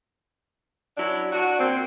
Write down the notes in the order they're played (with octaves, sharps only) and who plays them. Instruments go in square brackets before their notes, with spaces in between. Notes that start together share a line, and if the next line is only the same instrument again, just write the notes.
[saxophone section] F#3 D4 E4
D4 F#4
A#2 C4